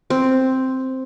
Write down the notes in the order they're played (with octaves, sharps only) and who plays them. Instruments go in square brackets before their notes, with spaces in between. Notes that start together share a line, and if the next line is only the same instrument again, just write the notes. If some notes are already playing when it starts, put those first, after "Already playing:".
[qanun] C4